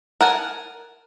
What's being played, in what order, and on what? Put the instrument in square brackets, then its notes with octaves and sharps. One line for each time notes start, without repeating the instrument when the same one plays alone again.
[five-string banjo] A#4 F#5 G#5 A5